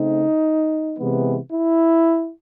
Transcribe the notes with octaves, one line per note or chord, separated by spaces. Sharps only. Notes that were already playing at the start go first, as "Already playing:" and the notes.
Already playing: C#3 A3 C4 D#4
C3 E3 G#3 B3
E4